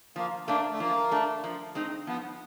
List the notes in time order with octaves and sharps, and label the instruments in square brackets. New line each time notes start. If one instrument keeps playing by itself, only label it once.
[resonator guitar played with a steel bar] F3 [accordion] A#3
[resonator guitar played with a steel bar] A3 D4 [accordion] A#3
[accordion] A3
[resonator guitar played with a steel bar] F3 [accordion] A#3
[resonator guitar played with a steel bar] A3 D4
F3
G#3 C4 D#4
[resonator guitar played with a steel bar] F3 [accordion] B3